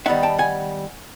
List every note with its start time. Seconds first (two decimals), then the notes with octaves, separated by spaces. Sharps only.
0.06 D#3 G3 B3 D#4 E5 F#5
0.23 G5 A5
0.38 F#5 G#5